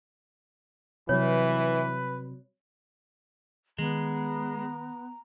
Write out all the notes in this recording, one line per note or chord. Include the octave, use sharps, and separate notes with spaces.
C3 E3 F#3 G3 B4 C#5
D#3 G#3 B3 A#5